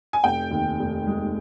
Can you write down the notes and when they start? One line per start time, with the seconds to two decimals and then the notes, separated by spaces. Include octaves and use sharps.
0.13 G#5
0.24 F1 G5
0.51 D#2
0.79 F1
1.07 G#3